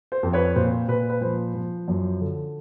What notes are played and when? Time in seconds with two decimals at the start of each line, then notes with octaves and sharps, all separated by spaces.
0.12 C5
0.23 F2
0.33 B4 C#5
0.56 A#2 C5
0.88 A#2 B4
1.10 B4
1.21 F3 C5
1.55 F3
1.88 F#2
2.21 D3